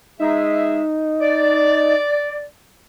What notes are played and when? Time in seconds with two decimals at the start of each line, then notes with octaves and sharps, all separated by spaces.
0.20 G#3 D#4 G#4 E5
1.21 D5